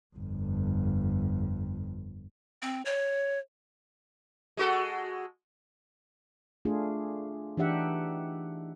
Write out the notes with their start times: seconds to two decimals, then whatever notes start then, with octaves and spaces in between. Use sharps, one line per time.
0.16 G1 F2
2.62 C4
2.85 C#5
4.57 G#3 F#4 A4
6.65 A3 D4 F4 G#4
7.57 E3 D4 D#4 G4 E5 F#5